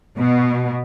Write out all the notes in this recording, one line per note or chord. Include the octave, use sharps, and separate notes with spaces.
B2